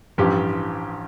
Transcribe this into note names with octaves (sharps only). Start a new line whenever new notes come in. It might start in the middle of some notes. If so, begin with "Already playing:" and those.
A1 G2 F3 G4